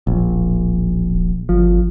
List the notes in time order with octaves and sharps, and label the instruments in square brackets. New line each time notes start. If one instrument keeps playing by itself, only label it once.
[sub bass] D1 [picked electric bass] A#1
[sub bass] G1 [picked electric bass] F3